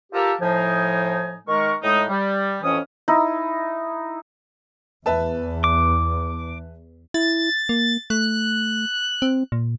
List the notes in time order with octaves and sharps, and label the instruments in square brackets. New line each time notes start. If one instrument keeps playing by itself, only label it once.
[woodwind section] F4 G4 A4 A#4
A2 F3 D#4 G#5
D#3 G#3 A#4 C#6
A2 G#3 D#4
G3
F2 A2 E3 C#4 C#5 D#6
[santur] D#4 E4
[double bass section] E2 [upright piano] B4 E5 A5
[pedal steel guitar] D6
[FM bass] E4 [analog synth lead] A6
[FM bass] A#3
[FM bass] A3 [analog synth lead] F#6
[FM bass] C4
A#2